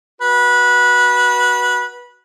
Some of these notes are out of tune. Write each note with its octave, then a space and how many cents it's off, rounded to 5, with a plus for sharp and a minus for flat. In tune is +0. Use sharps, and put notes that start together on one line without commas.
F#4 +0 B4 -20